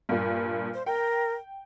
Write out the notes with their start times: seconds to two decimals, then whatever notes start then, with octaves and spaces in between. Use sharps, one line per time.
0.09 G2 A#2
0.74 C5
0.86 A#4 G5